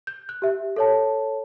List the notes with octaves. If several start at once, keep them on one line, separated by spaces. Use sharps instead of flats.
G6
F#6
G4 E5
A4 C#5 A5